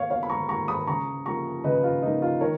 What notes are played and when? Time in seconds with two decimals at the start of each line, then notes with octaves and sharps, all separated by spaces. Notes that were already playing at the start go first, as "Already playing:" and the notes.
Already playing: B2 A#3 C#5 F5
0.10 B2 C#5 F5
0.23 B5
0.30 A#5 C#6
0.49 A#3 A#5 C#6
0.68 B5 D#6
0.87 C#3 A#5 C#6
1.26 F3 A#3 A#5 C#6
1.64 C#3 B4 D#5
1.84 F4
2.02 F3 A#3 D#4
2.22 F4
2.41 D#3 A#4 C#5